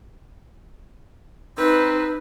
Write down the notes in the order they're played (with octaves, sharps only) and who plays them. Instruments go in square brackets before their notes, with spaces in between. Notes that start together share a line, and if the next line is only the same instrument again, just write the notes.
[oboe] C4 [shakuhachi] D#4 [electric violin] B4